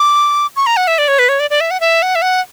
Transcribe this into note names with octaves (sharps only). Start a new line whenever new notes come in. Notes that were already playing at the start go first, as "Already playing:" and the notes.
Already playing: D6
C#6
A#5
F#5
E5
D5
C#5
B4
C#5
D5
D5
E5
F#5
E5
F#5
E5
F#5